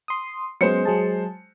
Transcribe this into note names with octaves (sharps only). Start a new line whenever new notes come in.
C6 D#6
F#3 G#3 B3 C#4 C5 C#7
F#3 G#4 A5